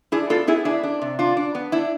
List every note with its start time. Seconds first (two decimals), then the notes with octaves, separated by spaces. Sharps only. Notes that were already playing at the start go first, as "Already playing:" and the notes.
0.12 D4 E4 G#4
0.30 B3 F4 A4
0.47 B3 E4 G#4
0.65 D4 E4 G#4
0.83 D4
1.02 C3
1.19 D4 F4
1.37 D4
1.55 B3
1.72 D4 E4